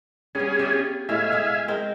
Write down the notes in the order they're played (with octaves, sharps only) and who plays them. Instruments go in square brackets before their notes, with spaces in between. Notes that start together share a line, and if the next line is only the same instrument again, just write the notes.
[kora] G3 B3 [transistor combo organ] C#4 G#4
[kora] F4 G4 E5
[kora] A2 G#3 [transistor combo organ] E5 F5 G#5
[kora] G#3 G#4
G#3 C4 A#4